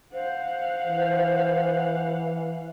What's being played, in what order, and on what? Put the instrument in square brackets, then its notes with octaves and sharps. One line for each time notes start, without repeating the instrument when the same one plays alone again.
[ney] C5 [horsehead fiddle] F5 F#5
[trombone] E3